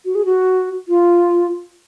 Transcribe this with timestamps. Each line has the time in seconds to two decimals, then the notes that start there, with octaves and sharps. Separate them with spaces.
0.05 F#4
0.15 G#4
0.25 F#4
0.88 F4